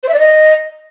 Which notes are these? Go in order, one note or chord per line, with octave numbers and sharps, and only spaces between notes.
C5
E5
D5
D#5